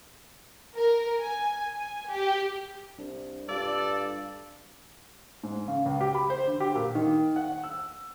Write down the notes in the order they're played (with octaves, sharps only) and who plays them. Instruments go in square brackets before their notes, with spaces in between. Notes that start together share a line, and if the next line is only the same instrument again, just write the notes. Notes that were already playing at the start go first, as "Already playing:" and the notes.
[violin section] A#4
G#5
G#5
G4
[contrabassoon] C2 [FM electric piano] D4
[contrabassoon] G2 [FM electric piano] F4 F5 E6 [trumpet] A4 [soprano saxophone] D5
[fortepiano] G#2
C#3
C#2
G4
B5
C5
D3
G4
A#2
D#3
F#5
E6